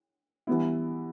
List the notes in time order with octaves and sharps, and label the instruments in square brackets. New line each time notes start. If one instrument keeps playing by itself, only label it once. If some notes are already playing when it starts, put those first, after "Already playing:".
[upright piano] E3 G3 B3 E4